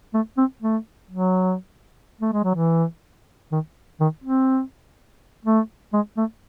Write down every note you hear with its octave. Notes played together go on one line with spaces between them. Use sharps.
A3
C4
A3
F#3
A3
G#3
F#3
E3
D#3
D#3
C4
A3
G#3
A3